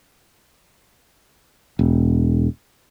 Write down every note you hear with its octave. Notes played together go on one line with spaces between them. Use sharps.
E1